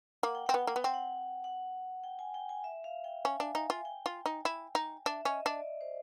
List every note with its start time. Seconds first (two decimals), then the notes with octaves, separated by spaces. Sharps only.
0.23 A#3 F#5
0.35 G5
0.46 C4 F#5
0.54 B3 G5
0.67 A#3 F#5
0.76 B3
0.82 C4 G5
0.94 F#5
1.44 F#5
2.04 G5
2.19 G#5
2.34 G5
2.49 G#5
2.64 E5
2.84 F5
3.04 G5
3.25 C#4 G#5
3.40 D4
3.55 D#4
3.70 F4 G#5
3.85 G5
4.06 F4
4.26 D#4
4.45 E4
4.75 D#4
5.06 D4 E5
5.25 C#4 D#5
5.46 D4 D5
5.81 C5